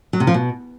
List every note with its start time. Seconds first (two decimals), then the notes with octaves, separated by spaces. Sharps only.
0.13 F#3
0.20 C3
0.27 F3
0.34 B2